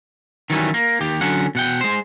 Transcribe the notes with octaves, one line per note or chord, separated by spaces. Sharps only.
D#3 E3 F#3 G3 C#4
A#3
D#2 G4
D3 F#3 C#4 F#5
B2 F#5 G5
G#3 C5